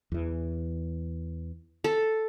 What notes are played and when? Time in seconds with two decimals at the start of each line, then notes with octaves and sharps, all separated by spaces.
0.12 E2 E3
1.84 A4